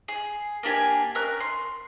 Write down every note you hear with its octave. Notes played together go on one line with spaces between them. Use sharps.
G#4
A#3 D4 G4 G#5
C#4 A#4 F#6
C6